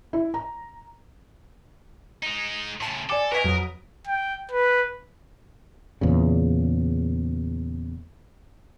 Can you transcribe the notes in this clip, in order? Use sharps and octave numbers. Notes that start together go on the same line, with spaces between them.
E4
A#5
G#3 D#4
A2 C#3 A5 C6
A4 D5 G#5 D6
A#4 B4 D#5 G#5 C#6 B6
F2 F#3 D#6
G5
B4
E2 A#2 C#3